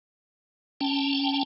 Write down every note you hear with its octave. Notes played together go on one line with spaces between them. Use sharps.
C#4 G5 A5